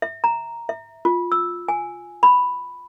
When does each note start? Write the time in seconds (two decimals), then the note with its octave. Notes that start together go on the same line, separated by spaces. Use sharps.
0.02 E5
0.24 A#5
0.69 E5
1.05 F4
1.32 E6
1.68 G#5
2.23 B5